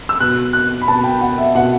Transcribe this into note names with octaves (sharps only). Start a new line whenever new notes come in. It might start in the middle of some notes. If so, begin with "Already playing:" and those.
E6
B2 F#6
F#6
B5
B2 A5
G5
F#5
E5
B2 F#5